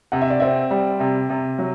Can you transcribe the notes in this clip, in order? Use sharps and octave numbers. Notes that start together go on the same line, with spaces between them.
C3 F#5
E5
D5
C4 E5
G3
C3
C3
F#3